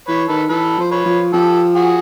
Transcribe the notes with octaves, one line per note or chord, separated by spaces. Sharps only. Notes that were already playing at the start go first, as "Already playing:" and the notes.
E3 B4 C#5
D#3 A4 B4
E3 A4 B4
F3 C5
B4 C#5
F3
F3 G4 A4
F#4 G#4